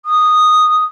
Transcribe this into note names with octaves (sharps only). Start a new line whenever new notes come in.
D#6